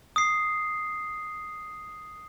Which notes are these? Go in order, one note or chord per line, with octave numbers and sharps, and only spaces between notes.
D#6 C7